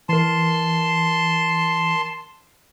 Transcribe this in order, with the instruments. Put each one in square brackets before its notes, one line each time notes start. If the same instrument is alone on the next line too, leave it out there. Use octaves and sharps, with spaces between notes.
[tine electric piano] E3 A#4 [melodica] A5 C6